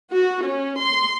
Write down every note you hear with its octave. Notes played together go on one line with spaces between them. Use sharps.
F#4
C#4
C6